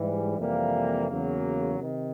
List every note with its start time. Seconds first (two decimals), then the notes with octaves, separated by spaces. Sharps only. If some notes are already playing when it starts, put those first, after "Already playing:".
Already playing: G#2 E3 G3
0.38 F2 C3 E3 G3 A#3
1.08 E2 C#3 F#3 A#3
1.80 C3 D#3